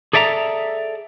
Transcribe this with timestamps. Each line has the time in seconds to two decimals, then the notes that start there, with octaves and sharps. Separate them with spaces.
0.13 G#4 A4 D5 E5 G5 A#5